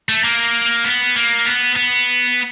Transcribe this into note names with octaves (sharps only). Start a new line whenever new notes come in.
A3
A#3
B3
A#3
B3
B3